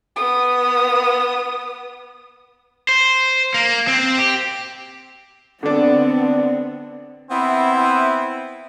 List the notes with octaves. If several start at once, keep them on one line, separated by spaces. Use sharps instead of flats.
B3 D#6
C5
A#3
C4
G4
D3 B3 C4 D4
B3 C4 E4